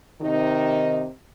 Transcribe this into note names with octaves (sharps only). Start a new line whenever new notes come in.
C3 D#3 D#4